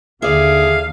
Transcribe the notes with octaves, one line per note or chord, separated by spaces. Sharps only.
D#2 D3 E4 G#4 D5 F5